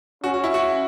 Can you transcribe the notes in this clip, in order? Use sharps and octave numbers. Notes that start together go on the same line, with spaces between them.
C#4 F#4
F#4
E4
F#4